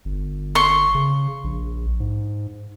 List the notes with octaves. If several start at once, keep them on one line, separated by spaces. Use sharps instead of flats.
G1
C6 C#6
C#3
A#1
G#2